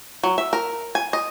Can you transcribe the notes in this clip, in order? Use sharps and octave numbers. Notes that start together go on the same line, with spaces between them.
F#3
E5
A#4
G#5
D#5